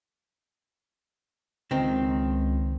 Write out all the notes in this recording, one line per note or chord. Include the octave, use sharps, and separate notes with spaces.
C#2 D#3 C4